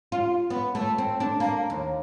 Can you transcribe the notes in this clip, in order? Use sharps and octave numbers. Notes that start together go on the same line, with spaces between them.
F4
B3
A3
C4
D4
A#3
D#2